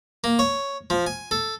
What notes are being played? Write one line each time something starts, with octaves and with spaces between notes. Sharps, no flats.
A#3
C#5
F3
G#5
A4